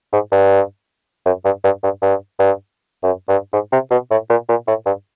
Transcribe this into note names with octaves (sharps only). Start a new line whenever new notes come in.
G#2
G2
F#2
G2
G2
G2
G2
G2
F#2
G2
G#2
C3
B2
A2
A#2
A#2
A2
G2